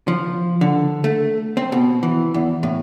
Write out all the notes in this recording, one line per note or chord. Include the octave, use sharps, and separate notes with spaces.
F3
D3
A3
C4
B2
E3
E2
A2